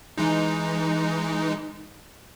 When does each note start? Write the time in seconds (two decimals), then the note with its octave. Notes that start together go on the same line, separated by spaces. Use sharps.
0.18 E3 G#3 D#4